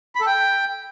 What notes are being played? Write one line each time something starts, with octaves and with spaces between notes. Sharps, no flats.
B5
A4
G5